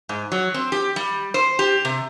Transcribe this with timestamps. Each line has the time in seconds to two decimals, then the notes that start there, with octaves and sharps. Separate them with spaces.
0.09 G#2
0.32 F#3
0.54 C4
0.72 G4
0.96 G3
1.34 C5
1.59 G4
1.85 C3